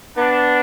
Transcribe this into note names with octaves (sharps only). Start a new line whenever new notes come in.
B3 D4